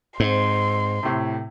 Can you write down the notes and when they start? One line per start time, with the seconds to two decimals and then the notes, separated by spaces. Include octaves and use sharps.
0.20 G#2 C4 C6
1.03 A2 C3